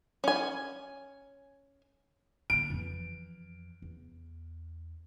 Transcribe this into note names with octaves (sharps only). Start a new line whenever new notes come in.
C#4 G#5
D3 A#3 D7
F2 E3
E2